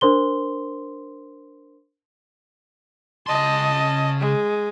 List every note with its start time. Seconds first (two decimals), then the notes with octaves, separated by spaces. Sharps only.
0.01 D4 A#4 C5 C6 G7
3.27 C#3 D#5 A5 C6
4.20 G#3